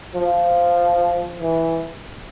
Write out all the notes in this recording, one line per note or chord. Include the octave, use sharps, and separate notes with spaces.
F3
E3